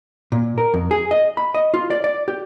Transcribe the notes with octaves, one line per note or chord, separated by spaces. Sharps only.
A#2
A#4
F2
G#4
D#5
B5
D#5
F4
D5
D5
G4